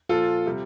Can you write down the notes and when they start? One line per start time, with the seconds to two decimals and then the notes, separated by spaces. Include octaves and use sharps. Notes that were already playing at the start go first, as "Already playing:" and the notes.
0.09 A#2 F3 F4 A4
0.46 C3 G3